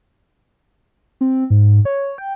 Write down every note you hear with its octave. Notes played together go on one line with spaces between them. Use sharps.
C4
G#2
C#5
G5